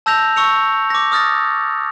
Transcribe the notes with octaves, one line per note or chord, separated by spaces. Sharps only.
A5 E6 G6 A#6 F7
C#6 E6 C#7 F7
D6 A#6
D#6 F6 A6 A#6